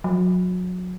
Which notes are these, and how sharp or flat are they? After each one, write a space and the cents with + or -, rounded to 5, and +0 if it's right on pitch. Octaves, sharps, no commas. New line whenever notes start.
F#3 -30